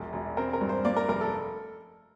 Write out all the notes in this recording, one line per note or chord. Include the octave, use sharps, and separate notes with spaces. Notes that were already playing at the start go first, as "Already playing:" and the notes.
Already playing: E1 A#1
E1
C4 A#4
A#4
G2
C5
A#3 D5
A#4
F1 A#4
A4